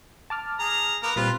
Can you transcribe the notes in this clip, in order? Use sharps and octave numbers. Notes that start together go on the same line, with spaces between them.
A5 D6 F6
G#4 A#5
A#3 B3 A#5
A#2 G3 C4 F4 B4